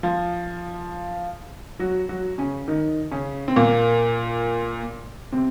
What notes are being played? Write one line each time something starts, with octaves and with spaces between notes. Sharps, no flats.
F3 F4
F#3 F#4
F#3 F#4
C#3 C#4
D#3 D#4
C#3 C#4
C4
A#2 A#3
C3 C4